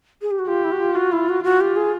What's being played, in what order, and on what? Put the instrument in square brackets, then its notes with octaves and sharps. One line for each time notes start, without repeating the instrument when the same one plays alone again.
[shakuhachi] G#4
G4
F#4
[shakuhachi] F4 [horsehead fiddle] G4
[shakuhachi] E4
F#4
F4
[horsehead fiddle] F4 [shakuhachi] F#4
[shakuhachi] E4
F#4
[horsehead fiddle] F4 [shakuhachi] F#4
[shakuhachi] G4
G#4